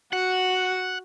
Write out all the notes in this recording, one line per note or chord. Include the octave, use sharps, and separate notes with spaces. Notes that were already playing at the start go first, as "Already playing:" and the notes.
F#4 F#5